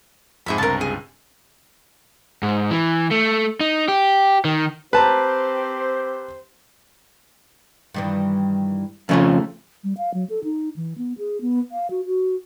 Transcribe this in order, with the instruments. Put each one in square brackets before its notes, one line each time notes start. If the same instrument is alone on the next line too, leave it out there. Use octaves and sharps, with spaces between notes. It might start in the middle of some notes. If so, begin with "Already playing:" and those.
[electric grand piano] F2 G#2 [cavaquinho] G#4 E5 B5
[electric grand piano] C#2 G2 C3 [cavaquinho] A#4 A5
[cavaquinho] G#4
[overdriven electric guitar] G#2
E3
A3
D#4
G4
D#3
[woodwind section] C4 G4 C5 [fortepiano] B4 A5 A#5
[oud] G2 D#3 E3
[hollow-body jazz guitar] F2 C#3 F3 [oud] A3 C#4 D#4
[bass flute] G3
F5
F#3
A4
D#4
E3
B3
G#4
B3
F5
F#4
F#4